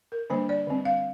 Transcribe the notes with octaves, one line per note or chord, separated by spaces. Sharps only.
A#4
D3 G3 A#3 D4 C5
D5
D3 G3 C4
F5